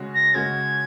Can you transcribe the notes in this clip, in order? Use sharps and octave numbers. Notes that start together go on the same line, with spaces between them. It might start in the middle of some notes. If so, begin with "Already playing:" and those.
Already playing: C#3 G#3 C#4 F#4
A#6
C#3 G#3 C#4 F#4 G#6